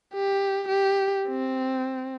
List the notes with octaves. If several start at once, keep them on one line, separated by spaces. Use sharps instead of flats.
G4
G4
C4